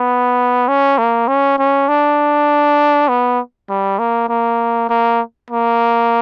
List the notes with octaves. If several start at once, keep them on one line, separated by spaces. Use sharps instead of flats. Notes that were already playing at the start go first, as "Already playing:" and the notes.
Already playing: B3
C#4
A#3
C#4
C#4
D4
B3
G3
A#3
A#3
A#3
A#3